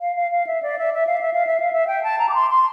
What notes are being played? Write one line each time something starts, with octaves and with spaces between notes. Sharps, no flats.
F5
F5
F5
E5
D5
E5
E5
F5
E5
F5
E5
F5
E5
G5
A5
A#5
D6
C6
C6